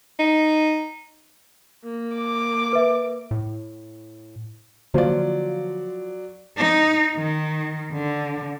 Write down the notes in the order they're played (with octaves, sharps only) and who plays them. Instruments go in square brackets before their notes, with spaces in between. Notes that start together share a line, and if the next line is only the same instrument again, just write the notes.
[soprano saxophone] D#4
[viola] A#3
[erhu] D6
[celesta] B4 E5
[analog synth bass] A2
[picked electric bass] D3 A#3 [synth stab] F3 F4 [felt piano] F#3 D5
[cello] D#4
D#3
D3